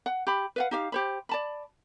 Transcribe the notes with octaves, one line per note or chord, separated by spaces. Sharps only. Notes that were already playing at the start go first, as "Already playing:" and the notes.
F#5
G4 B5
B4 F5 F#5
D#4 G4 F5
G4 C5 B5
D5 A5 B5